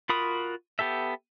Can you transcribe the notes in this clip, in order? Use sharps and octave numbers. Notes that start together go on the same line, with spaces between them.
F4 F#4 A#4 B5 D#6
B3 G4 A4 E5